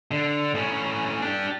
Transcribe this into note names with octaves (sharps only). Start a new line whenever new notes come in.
D3
A2 C#4
D4 G4